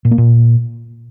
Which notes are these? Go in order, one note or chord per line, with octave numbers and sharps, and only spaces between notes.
A#2
A#3
A#2